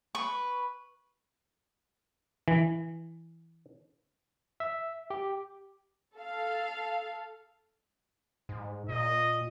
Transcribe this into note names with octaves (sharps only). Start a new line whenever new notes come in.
B4 C#6
E3
E5
G4
A4 F5
G#2
A#2 D#5